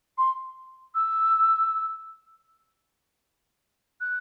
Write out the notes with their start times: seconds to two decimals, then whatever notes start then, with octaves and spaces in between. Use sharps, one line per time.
0.18 C6
0.95 E6
4.01 F#6